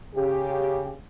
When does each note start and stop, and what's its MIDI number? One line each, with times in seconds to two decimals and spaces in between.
0.15 0.93 49
0.15 0.93 67